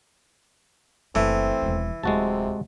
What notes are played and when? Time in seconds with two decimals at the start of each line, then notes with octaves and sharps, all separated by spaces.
1.15 F#1 E3 A3 C4
1.62 E1 F3
2.03 D1 C3 G#3 F#4 A5